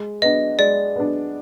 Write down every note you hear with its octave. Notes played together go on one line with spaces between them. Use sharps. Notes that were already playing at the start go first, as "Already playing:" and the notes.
Already playing: G#3
B3 D4 D#5
G#3 D5
B3 D4